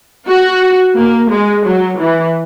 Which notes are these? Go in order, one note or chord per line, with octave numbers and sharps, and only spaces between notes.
F#4
A#3
G#3
F#3
E3